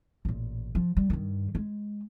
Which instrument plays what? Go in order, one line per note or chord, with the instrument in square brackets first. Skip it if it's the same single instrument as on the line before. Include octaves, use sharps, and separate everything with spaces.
[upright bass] A1 A#2
F3
G3
G2 D#3
G#3